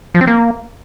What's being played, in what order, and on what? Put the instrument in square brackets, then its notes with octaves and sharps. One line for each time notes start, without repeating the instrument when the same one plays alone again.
[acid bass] F3
C4
A#3